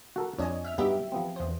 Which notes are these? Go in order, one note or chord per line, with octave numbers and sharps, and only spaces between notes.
F#4 A4 A#4
F2 D4 C#5 D#5 G#5
E5 F6
G2 F#3 B3 D#4 G4 E5
F3 B3 C4
E2 C5